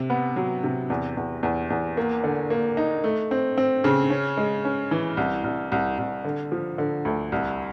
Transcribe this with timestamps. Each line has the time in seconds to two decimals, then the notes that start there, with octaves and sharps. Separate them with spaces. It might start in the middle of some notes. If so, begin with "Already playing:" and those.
Already playing: C3
0.10 B3
0.36 F#3
0.64 C3
0.90 E2
1.17 E2
1.43 E2
1.70 E2
1.97 A#3
2.24 D3
2.50 A#3
2.77 D#4
3.04 A3
3.31 C4
3.58 C4
3.84 C#3
4.10 C#4
4.37 G#3
4.65 C#4
4.91 E3
5.17 C2
5.44 C2
5.72 C2
5.98 C2
6.25 D3
6.52 F3
6.78 D3
7.05 D2
7.32 C2